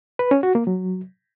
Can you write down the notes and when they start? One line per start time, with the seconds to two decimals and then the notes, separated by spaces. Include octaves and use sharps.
0.19 B4
0.31 C#4
0.43 F#4
0.55 A#3
0.67 F#3